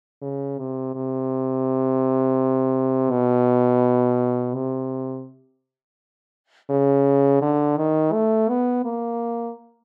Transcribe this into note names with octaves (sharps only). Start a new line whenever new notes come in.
C#3
C3
C3
B2
C3
C#3
D3
D#3
A3
B3
A#3